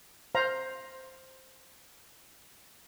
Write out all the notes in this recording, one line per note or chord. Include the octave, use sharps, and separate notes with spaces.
C5 F5 A#5